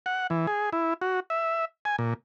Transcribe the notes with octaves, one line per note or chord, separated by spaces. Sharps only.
F#5
E3
G#4
E4
F#4
E5
G#5
A#2